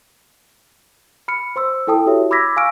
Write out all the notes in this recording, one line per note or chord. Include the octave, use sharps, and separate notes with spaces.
B5 F6 C#7
C5 C6 E6
E4 A4 G5 A5 D#6
E4 F#4 G4 C#5 E5
B5 D6 E6 G#6 A#6 B6
F5 G#5 C#6 E6 F6 D7